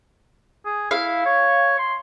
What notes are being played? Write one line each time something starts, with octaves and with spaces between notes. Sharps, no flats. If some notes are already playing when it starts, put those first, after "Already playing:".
G#4
E4 F5
C#5
C6